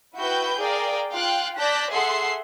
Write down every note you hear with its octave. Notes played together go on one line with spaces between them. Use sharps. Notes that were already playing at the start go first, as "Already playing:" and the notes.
E4 F#4 B4 G5 B5 G6
G#4 A#4 D5 F5 G5
F4 F5 G5 F#6
D5 A5 F#6 G6 A#6 B6
G#4 A4 E5 F#5 C6 C7